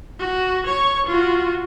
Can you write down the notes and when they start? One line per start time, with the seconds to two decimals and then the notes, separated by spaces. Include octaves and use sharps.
0.19 F#4
0.66 C#5 C#6
1.06 F4 F#4